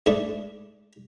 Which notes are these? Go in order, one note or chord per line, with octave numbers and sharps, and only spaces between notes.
G#2 A3 D4